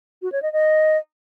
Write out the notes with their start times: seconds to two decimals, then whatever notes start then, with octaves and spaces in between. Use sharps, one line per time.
0.22 F#4
0.32 C#5
0.42 D#5
0.53 D#5